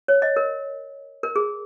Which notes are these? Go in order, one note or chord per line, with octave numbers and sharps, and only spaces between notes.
C#5
D#5
A#4
A#4
G#4